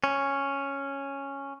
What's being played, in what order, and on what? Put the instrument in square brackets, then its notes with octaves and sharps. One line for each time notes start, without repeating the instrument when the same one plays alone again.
[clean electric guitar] C#4